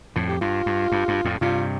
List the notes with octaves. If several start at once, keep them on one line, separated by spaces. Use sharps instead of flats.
F2 A2
G4
G2 F4
G2
G2
G2
F2 A2
G2 C3 F4